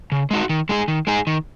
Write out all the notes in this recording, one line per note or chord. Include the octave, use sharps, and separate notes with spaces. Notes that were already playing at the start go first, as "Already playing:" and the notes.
C#3
G#3 D#4 F#4
D#3
G#3 D#4 G#4
D#3
G#3 D#4 G#4
D#3